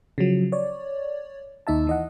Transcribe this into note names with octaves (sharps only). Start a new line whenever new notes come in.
C#3 F3 F#3
C#5 D5
D#2 D#4 E5 A5
E3 D#5 F#5